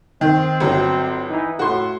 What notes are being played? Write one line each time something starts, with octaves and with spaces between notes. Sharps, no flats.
D#3 C4
G1 F#3
E3 D#4
A2 F#4 C6